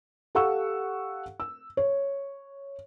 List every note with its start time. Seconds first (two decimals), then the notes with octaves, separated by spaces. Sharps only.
0.35 G4 A4 F5 F#5 C#6 E6
1.40 E6
1.77 C#5